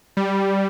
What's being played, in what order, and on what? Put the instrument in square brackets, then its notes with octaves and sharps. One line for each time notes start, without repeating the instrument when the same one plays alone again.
[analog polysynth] G3